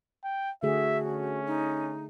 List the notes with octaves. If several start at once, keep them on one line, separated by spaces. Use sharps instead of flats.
G5
D3 A3 F#4 G#4 E5
C#4
D#4